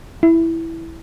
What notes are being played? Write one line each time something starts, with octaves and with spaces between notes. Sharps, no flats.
E4